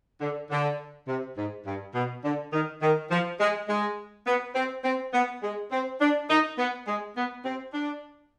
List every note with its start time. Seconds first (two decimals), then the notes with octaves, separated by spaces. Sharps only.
0.21 D3
0.51 D3
1.08 C3
1.37 G#2
1.66 G2
1.94 B2
2.24 D3
2.53 D#3
2.82 D#3
3.11 F3
3.40 G#3
3.68 G#3
4.27 B3
4.55 C4
4.84 C4
5.13 B3
5.42 G#3
5.72 C4
6.01 D4
6.30 D#4
6.58 B3
6.87 G#3
7.16 B3
7.45 C4
7.73 D4